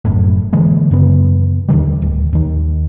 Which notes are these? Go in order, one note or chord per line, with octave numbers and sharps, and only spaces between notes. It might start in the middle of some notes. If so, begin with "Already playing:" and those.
F1 F#2 A2
D3 E3 G#3 A#3
F#2 C#3 B3
D#2 D3 D#3 G3
D1
D#2 D#3